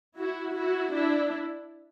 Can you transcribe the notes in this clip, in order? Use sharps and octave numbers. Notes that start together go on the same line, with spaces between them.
E4 F#4
E4 F#4
D4 E4